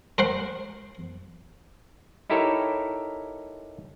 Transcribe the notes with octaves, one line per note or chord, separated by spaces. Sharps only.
A#4 C5 F#5 C6
D#4 E4 G4 A4 A#4 C#5